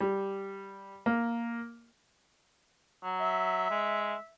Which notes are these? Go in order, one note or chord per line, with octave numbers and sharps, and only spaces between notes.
G3
A#3
F#3
E5
G#3